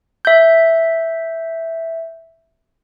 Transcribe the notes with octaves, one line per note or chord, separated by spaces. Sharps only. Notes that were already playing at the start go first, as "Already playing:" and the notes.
E5 G6